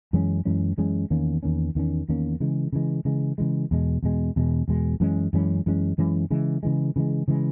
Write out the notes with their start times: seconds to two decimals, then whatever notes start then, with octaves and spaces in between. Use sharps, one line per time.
0.13 F#2 E3 G#3 C#4
0.45 F#2 E3 G#3 C#4
0.78 F#2 E3 G#3 C#4
1.10 E2 D#3 A#3 C#4
1.43 E2 D#3 A#3 C#4
1.75 E2 D#3 A#3 C#4
2.09 E2 D#3 A#3 C#4
2.40 C#3 E3 G#3
2.73 C#3 E3 G#3
3.05 C#3 E3 G#3
3.38 C#3 E3 G#3
3.71 E2 B2 G#3
4.03 E2 B2 G#3
4.36 E2 B2 G#3
4.68 E2 B2 G#3
5.00 F#2 E3 G#3 C#4
5.33 F#2 E3 G#3 C#4
5.66 F#2 E3 G#3 C#4
5.98 F#2 E3 G#3 C#4
6.31 C#3 E3 G#3
6.63 C#3 E3 G#3
6.96 C#3 E3 G#3
7.28 C#3 E3 G#3